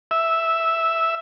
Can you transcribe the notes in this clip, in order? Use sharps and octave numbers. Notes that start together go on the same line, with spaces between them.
E5